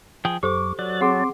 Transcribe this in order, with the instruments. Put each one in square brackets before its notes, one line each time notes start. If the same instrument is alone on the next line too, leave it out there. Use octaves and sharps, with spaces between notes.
[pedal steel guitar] F3 G#4 G5
[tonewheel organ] F#2 [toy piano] G4 A4 C5 [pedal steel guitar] C#6 D6
[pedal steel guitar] F#3 [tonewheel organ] D5 F#6 A6
[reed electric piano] C4 C6 D6 [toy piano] G#4 F#5 [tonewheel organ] C#5 A5